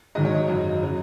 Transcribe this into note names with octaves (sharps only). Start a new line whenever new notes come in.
G#2 D#3 F#3 D#5
C#5
D#5
F#2 C#3 F#3 D#5
C#3 F#3